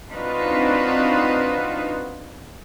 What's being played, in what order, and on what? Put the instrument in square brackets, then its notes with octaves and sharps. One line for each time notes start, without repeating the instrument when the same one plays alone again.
[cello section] C4 D4 D#4 F4 F#4 B4